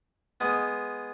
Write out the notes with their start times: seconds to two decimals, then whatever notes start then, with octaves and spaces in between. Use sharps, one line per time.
0.40 G#3 B3